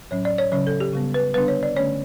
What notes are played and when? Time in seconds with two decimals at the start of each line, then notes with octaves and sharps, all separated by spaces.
0.11 A2 F#3 C#4 C#5
0.25 D5
0.38 C#5
0.52 C#3 F#3 C#4 C#5
0.67 A4
0.80 G4
0.93 C#3 G3 B3
1.14 B4
1.34 D3 G3 B3 D4 B4
1.48 C#5
1.63 D5
1.77 D3 A3 C#4 C#5